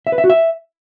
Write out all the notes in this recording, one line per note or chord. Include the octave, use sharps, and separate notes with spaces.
E5
B4
E5
F#4
E5